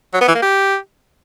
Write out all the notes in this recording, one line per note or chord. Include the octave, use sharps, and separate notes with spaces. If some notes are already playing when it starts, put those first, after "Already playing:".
F#3
B3
E3
A#3
G4